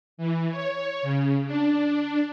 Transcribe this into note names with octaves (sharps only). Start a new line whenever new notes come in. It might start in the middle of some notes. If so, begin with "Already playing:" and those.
E3
C#5
C#3
D4